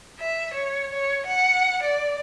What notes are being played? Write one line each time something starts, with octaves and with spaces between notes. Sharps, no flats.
E5
C#5
C#5
F#5
D5